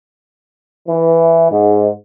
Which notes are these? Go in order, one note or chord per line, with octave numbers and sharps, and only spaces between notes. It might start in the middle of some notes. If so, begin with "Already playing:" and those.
E3
G#2